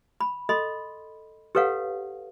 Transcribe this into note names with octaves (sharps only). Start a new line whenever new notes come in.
B5
A4 D#5 B5 C6
G4 A4 B4 C#5 F5 F#5